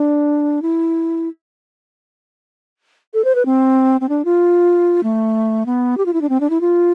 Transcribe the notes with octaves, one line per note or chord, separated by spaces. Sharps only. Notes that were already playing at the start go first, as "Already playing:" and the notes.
Already playing: D4
E4
A4
C5
B4
C4
C4
D4
F4
A3
B3
G4
F4
E4
D4
C4
D4
E4
F4